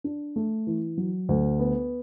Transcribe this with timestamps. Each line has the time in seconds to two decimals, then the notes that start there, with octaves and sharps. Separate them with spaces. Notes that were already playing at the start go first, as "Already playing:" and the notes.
0.04 D4
0.36 A3
0.67 E3
0.97 F#3
1.29 D2
1.59 B3